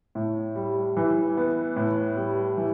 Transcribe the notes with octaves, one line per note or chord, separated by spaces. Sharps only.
A2
G3
E3
B3
A2
G3
E3